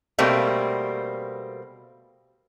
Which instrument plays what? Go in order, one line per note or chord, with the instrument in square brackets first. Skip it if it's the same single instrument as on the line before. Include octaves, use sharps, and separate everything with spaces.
[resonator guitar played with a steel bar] B2 G3 A3 A#3 C4